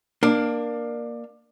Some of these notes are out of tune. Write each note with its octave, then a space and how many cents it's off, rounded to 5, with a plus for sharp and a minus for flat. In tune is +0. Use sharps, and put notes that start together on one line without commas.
A#3 +10 D4 +20